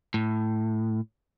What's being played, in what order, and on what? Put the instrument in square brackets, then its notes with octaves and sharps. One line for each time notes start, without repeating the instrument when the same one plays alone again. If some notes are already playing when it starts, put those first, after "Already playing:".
[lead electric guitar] A2